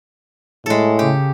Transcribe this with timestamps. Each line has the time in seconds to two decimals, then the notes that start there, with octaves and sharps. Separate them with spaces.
0.66 A2 G#3 A4
0.99 C#3 G4